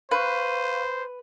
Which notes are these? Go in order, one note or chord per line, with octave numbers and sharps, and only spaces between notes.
B4 C5 F5 C#6